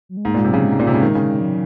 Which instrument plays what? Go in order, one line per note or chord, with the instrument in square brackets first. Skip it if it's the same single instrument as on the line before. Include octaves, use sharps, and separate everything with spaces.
[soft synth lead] F#3
G#3
[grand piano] G#2 [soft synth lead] A#3
[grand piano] A#2 [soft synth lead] G#3
[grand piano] C3
[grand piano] C#3 [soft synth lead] F#3
[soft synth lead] G#3
[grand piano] G#2
A#2
C3
C#3
D#3
C#3
[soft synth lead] F#3